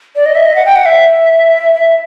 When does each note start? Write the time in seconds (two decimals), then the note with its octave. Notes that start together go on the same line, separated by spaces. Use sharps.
0.16 D5
0.26 D#5
0.35 E5
0.46 D#5
0.56 F#5
0.66 G5
0.76 F#5
0.85 E5
1.74 E5